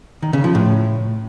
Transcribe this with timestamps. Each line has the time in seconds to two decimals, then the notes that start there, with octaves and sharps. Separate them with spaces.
0.23 D#3
0.33 C#3
0.44 F3
0.55 A2